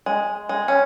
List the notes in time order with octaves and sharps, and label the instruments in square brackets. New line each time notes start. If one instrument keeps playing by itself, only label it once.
[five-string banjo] G#3
G#3
C#4